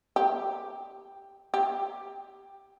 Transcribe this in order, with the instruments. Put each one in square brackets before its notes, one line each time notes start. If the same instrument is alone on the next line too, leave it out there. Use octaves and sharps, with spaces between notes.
[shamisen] G4
G4